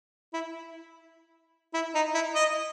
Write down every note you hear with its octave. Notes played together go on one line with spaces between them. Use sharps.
E4
E4
D#4
E4
D#5